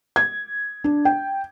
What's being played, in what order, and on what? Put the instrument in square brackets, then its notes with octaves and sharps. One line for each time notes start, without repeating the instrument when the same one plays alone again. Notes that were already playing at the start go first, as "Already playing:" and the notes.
[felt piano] G#6
D4
G5